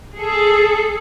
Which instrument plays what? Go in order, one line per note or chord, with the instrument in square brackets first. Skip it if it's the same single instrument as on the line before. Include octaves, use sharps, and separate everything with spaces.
[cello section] G#4 A4